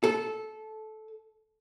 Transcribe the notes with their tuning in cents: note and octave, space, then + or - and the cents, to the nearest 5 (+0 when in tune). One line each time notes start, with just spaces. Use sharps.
A4 -15